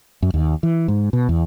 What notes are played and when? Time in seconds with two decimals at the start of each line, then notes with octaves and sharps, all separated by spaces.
0.22 F#2
0.34 D#2
0.63 E3
0.88 G#2
1.13 B2
1.29 E2